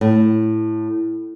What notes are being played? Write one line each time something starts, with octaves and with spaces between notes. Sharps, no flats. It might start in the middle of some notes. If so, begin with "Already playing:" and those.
A2